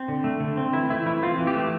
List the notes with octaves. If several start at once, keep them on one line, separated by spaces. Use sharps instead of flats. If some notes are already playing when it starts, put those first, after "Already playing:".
Already playing: C4
D3
A3
D3
C4
E3 E4
A3 E4
E3 E4
C4 F4
E3
G4
A3